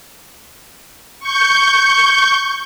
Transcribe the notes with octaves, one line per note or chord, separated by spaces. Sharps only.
C#6 G6